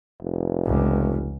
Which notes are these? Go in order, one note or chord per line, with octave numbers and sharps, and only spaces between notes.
F1
C#2